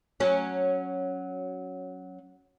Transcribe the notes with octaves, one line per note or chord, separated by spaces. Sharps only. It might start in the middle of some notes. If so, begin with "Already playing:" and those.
F#3 C#4